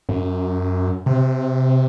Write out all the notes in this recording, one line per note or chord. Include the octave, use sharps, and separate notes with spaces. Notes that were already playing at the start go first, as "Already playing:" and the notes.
F#2
C3